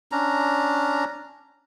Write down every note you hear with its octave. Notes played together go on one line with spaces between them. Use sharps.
C#4 D4 A#5